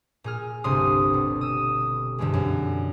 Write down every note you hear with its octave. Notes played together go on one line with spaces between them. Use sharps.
A#2 G#4 F6
G1 C2 C3 C6 D#6
B2
D#6 E6
C2 G2 D3 E3 G#3
F#2